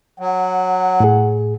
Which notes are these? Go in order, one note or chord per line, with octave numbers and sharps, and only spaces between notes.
F#3 F#5
A2 G#4